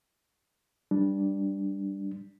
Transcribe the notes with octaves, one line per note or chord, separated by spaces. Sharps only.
G3 D4